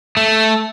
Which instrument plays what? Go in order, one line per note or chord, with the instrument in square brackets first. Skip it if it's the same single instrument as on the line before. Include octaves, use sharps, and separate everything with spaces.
[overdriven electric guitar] A3